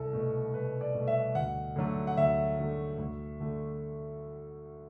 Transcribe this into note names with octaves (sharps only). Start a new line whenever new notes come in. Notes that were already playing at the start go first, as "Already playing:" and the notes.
Already playing: C2 A4
B2 A3
C2 B4
D5
B2 A3
E5
D2 F#5
D3 F#3 A3
F#5
D2 E5
D3 F#3 A3
D2
D3 A3